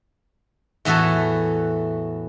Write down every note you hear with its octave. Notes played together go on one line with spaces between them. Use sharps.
E2 A2 E3 F#4 A4